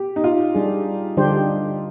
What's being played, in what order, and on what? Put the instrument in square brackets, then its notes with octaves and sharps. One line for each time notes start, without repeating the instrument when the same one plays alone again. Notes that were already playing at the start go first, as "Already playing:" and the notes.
Already playing: [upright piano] G4
D#4
F4
[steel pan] G3 D4 G#4
D3 G3 D4 G4 C5